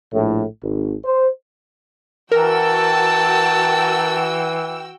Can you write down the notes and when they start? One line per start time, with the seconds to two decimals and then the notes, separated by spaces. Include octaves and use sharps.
0.12 A#1 A2
0.61 G#1
1.05 C5
2.32 E3 F#4 A#4 G5 A5 E6